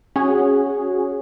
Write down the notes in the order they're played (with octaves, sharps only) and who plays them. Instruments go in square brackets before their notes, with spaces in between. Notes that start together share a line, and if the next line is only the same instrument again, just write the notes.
[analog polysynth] C#4 F#4 G#4